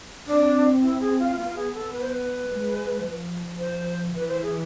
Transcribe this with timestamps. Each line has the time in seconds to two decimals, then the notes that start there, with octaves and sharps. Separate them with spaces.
0.26 C4 D4
0.82 E4
1.00 G#4
1.19 F4
1.38 B3 F4
1.55 G#4
1.74 A4
1.93 B4
2.02 C5
2.10 B4
2.48 G#3
3.04 F3
3.58 C5
4.15 E3 B4
4.28 C5
4.42 G#4